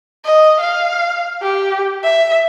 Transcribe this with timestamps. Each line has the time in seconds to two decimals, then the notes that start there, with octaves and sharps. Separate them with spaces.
0.24 D#5
0.60 F5
1.42 G4
2.04 E5